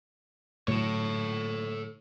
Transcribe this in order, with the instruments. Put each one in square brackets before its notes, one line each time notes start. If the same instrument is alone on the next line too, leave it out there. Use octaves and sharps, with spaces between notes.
[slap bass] A2 D3 F#3 [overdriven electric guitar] A4 C#5